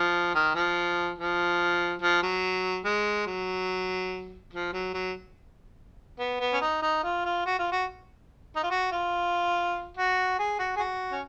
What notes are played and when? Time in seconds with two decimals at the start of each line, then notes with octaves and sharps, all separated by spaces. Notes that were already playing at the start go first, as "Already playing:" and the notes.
Already playing: F3
0.35 D#3
0.55 F3
1.18 F3
2.01 F3
2.22 F#3
2.85 G#3
3.26 F#3
4.53 F3
4.73 F#3
4.94 F#3
6.19 B3
6.40 B3
6.53 C#4
6.61 D#4
6.82 D#4
7.03 F4
7.25 F4
7.46 F#4
7.59 F4
7.72 F#4
8.56 D#4
8.63 F4
8.70 F#4
8.92 F4
9.97 F#4
10.39 G#4
10.59 F#4
10.76 G#4
10.79 F#4
11.12 C#4